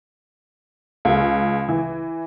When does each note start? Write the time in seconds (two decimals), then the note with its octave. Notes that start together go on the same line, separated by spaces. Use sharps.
1.05 C#2
1.69 E3